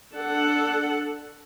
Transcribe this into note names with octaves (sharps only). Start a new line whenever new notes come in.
D4 A4 F#5